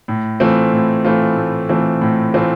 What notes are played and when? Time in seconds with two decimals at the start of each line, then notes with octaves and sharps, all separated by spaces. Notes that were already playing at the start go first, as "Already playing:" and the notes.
0.08 A2
0.40 E3 A3 C4 F4
0.73 A2
1.05 E3 A3 C4 F4
1.37 A2
1.69 E3 A3 C4 F4
2.01 A2
2.34 E3 A3 C4 F4